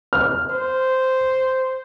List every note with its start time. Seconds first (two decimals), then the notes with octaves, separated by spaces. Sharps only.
0.13 F6
0.50 C5